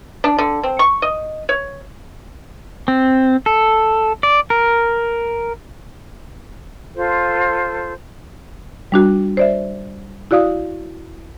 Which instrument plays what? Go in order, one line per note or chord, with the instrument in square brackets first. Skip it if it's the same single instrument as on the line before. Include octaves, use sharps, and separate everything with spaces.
[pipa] D4
D3
C4
C#6
D#5
C#5
[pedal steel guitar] C4
A4
D5
A#4
[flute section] F4 A4 C5
[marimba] G3 D4 F#4
C5 D5 E5
E4 F#4 D5 F5 D#6